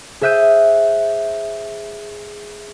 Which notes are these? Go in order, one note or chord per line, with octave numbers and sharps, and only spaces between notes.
G#4 C5 E5 F#6 G6 D#7